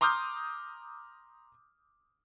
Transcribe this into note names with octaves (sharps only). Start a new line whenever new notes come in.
A#5 C6 D6 D#6 F6 G6